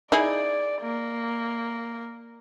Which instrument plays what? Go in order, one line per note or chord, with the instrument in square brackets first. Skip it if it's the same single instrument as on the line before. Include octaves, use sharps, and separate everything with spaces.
[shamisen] D#4 E4 G#4 [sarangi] D5
[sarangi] A#3